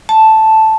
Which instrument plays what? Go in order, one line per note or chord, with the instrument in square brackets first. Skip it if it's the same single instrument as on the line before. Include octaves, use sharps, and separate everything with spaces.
[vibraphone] A5